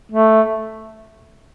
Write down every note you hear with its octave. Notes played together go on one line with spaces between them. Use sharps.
A3